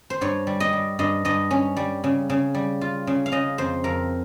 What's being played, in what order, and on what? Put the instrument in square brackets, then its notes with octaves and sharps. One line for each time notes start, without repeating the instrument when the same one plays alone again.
[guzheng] C5
G2 C#5
G3
D#5
G3
G2 D#5
G2 D#5
C#4
G3
C#3
C#3
G3
F4
C#3
F5
C#3 D#5
F2 C5
F2 A#4